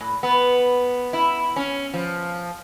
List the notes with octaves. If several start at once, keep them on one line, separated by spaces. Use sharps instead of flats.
A2
B3
E4
C#4
F3